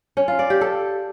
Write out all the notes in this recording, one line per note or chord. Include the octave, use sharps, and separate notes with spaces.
C#4
F4
D5
G4
A4